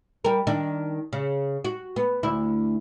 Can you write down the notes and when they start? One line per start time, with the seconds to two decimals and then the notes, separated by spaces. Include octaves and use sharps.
0.25 G3 A#4
0.47 D#3 D4
1.13 C#3
1.65 F#4
1.96 B3
2.23 D2 E4